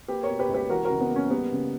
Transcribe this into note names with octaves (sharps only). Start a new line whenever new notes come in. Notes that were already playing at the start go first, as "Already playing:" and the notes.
A#3 G4 B4
A#4 C#5
B2
G4 B4
C#2
G4 B4
E3 F#4 A#4
F#4 A#4
C#3
B3
A#3
C#4
G3 B3
C#3